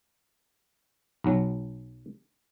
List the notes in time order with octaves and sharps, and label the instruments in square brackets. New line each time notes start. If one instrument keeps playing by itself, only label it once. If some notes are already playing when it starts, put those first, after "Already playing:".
[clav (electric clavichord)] B1 F#3